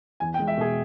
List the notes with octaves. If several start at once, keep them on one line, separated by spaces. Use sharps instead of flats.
E2 G#5
G5
G#3
E5
B2 G#4